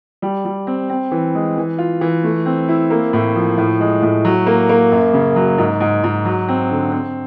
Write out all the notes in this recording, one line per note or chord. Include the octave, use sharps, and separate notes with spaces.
G3
G3
C4
C4
E3
G#3
E3
F4
E3
A3
C4
E4
A#3
A2
F3
A2
G#3
A2
F#3
A#3
A#3
F#2
C#3
F#3
G#2
G#2
G#2
F#3
C4
D3
C4